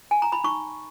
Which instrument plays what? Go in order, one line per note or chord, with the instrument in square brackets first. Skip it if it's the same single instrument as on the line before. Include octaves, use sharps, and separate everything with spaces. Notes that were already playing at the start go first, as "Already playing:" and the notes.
[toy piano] G#5
A#5
B5
D#4 C#6